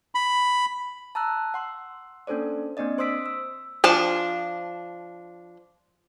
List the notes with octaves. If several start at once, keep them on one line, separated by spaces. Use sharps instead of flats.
B5
A5 A#5 E6 F#6
F#5 C6 E6
A#3 C#4 D4 A4 C5 D5
A#3 C4 D4 D5 D#5
C5 C6 D#6 E6 B6 D7
E6
F3 D4 F5 A5